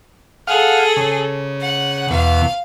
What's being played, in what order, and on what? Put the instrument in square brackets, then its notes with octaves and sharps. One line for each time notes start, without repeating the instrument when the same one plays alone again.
[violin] G#4 A4 [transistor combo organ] F5 F#5 F6
[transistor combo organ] C#3
[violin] F#5
[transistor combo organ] E2 B2 [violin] F5